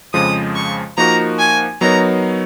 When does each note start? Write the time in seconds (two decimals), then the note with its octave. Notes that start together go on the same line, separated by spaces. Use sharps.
0.13 F2 C#3 F3 G#3 D#6
0.55 C#6
0.97 F3 A#3 D#4 F#4 A#4 A#5
1.39 G#5
1.81 F#3 B3 D#4 A#4 C#5 A#5